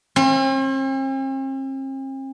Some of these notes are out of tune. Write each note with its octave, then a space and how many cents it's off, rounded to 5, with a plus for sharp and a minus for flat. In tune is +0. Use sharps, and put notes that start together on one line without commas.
C4 +45